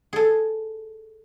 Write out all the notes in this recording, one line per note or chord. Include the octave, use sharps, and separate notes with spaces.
G#4 A4